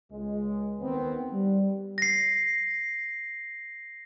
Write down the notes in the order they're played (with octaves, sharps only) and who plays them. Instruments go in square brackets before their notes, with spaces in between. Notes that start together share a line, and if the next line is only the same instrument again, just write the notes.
[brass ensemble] C#2 G#3
D#2 D#3 B3 C4
G3
[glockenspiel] A#6 C7